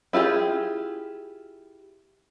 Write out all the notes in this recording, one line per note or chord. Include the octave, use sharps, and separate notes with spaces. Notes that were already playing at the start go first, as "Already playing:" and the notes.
E4 F4 G4 G#4